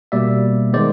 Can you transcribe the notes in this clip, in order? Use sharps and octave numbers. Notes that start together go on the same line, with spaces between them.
B2 G3 A#3 D5 E5
D#3 G#3 B3 C5 D5